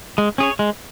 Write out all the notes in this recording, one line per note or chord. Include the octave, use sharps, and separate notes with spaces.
G#3
C#4 G#4 C#5
G#3